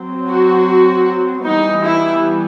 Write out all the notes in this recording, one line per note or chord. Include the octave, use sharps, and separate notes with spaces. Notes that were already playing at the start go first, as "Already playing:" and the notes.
Already playing: F#3 C4
F#4
E3 G3 B3 D#4
E4